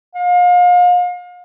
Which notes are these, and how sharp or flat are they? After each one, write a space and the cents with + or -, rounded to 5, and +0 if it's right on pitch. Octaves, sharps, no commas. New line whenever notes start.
F5 +35